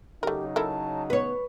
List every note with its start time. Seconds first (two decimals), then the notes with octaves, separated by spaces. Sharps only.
0.23 C#3 F#3 A3 D#4 G4 A#4
0.56 E4 A4 A#4 A5
1.10 B3 B4 C#5